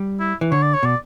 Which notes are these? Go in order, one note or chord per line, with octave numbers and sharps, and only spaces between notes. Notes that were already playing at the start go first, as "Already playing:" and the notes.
Already playing: G3
E4
E3
D3 C#5
D5
C#5
B2 D5